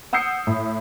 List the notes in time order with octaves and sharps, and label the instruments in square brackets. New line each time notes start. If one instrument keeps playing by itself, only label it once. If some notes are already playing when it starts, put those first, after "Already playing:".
[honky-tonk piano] F#5 D#6 E6 G6 C7 C#7
A2